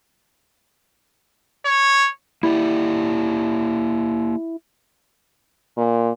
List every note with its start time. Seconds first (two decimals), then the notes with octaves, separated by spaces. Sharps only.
1.66 C#5
2.43 A#3 E4 G4 D5
5.77 A#2